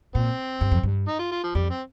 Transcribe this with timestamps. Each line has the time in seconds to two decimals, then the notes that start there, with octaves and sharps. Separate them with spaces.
0.15 A#2 C4
0.61 G2
0.71 F2
0.83 G2
1.08 D#4
1.19 F4
1.32 F4
1.43 F3
1.55 F2 G3
1.70 C4